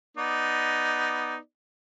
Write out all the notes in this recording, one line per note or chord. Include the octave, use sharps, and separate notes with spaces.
B3 D#4 D5